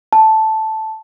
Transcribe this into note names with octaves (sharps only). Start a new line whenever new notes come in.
A5